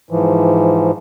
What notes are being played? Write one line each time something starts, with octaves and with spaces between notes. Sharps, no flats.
G#2 E3 F3